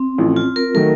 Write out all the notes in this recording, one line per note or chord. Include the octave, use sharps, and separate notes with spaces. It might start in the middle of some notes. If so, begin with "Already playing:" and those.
Already playing: C4
A1 A2 F3
F4
A#4
D#3 F#3 A3 A#4